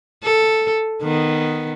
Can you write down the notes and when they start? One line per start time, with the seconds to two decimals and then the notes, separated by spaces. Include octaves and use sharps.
0.23 A4
1.02 D#3 B3